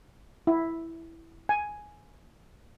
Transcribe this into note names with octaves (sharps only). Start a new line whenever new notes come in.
E4
G#5